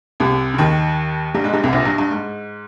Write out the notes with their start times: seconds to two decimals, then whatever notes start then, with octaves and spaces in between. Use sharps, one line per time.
0.20 C2 C3
0.54 C#3
0.58 D#2 D#3
1.34 G2 G3
1.44 G#2 G#3
1.53 G2 G3
1.63 C2 C3
1.73 A#1 A#2
1.85 G2
1.98 G2
2.11 G#2